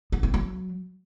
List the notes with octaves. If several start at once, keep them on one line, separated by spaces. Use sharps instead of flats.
B3
C4
F#3